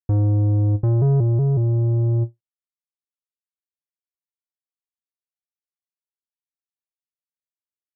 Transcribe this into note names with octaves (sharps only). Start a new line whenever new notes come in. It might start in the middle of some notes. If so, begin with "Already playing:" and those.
G#2
A#2
C#3
A#2
C#3
A#2